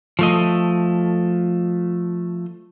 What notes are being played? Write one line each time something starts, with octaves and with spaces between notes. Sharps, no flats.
F3 A3 D#5